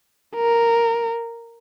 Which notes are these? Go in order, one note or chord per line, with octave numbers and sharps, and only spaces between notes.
A#4